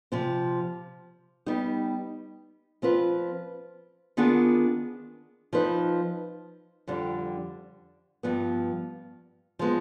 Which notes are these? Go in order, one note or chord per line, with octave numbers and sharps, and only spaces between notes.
C3 F3 C4
G3 B3 D#4 G4
F3 C4 F4 B4
D#3 B3 D4 F4 G#4
F3 C4 D#4 B4
F2 D3 G3
G2 F3 B3
F3 G#3 B3